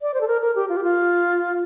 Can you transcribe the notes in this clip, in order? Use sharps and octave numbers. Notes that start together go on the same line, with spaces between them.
D5
C5
A4
A#4
A#4
G4
F4
G4
F4